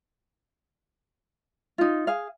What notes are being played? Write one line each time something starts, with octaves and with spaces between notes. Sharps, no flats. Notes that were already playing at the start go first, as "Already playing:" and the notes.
D#4 F4
G#4 F5